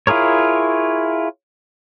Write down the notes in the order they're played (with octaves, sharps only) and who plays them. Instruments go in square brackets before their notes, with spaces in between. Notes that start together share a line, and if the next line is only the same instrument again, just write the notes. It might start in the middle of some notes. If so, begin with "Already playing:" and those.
[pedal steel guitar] E4 F4 G#4 A#4 C#5